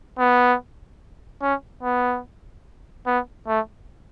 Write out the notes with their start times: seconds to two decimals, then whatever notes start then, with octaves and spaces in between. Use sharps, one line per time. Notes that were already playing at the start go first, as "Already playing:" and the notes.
0.18 B3
1.42 C#4
1.83 B3
3.06 B3
3.47 A3